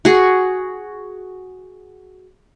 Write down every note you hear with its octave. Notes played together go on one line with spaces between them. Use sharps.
F#4 G#4